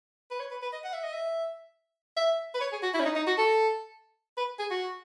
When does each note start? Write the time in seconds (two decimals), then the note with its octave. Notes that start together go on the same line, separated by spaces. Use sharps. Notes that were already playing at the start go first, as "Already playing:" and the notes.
0.31 B4
0.40 C#5
0.51 B4
0.62 B4
0.73 D#5
0.84 F#5
0.93 E5
1.03 D#5
1.13 E5
2.16 E5
2.54 B4
2.60 C#5
2.72 G#4
2.83 F#4
2.94 E4
3.00 C#4
3.05 D#4
3.16 D#4
3.27 F#4
3.38 A4
4.37 B4
4.59 G#4
4.70 F#4